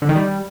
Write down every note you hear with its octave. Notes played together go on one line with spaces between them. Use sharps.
D3
D#3
G3